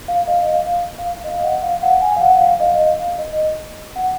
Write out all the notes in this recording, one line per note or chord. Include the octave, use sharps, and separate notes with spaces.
F5
D#5
F5
F5
F5
D#5
F#5
F5
F#5
G#5
F5
F#5
F5
D#5
F5
D#5
F#5